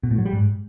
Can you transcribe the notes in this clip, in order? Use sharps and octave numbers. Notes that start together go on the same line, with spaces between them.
B2
A2
F#3
G3
G#2